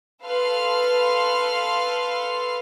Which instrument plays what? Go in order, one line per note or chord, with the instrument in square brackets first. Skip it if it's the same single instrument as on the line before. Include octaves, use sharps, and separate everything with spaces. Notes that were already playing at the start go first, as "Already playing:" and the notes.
[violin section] A4 B4 F5 C6 F6